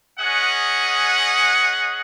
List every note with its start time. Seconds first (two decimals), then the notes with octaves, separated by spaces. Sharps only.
0.18 C#4 G#4 D#5 F#5